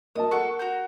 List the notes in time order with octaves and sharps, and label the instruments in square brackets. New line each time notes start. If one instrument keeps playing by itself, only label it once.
[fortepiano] A#3 D#5 A5 [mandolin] D#6
[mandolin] F#4 A4 C#6 [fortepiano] A#4
[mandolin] F#4 A#5 G6